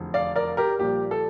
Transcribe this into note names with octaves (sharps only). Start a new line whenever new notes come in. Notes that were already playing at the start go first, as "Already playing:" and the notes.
Already playing: F1 E2 D3
D5 F5
A#4 D5
G4 A#4
A#1 A#2 G3 G4
A4